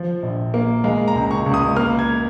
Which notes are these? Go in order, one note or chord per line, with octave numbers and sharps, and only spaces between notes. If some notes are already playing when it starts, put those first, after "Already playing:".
Already playing: F3
A#1
A#3
G#3 F5
A#5
C#2
C#6
C#2
D#6
A#3 F6
G#6